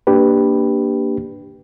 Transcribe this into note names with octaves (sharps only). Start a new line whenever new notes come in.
A#3 D4 G4 B4